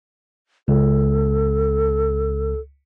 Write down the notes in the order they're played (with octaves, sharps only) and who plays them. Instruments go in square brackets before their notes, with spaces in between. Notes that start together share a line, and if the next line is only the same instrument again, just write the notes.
[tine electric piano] C#2 [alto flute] A4